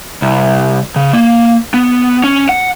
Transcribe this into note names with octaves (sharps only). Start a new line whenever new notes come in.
C2
C#3
A#3
B3
C#4
F#5